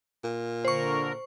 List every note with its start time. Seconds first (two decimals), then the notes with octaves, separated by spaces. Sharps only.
0.24 A#2
0.65 D3 A#4 C5 C#6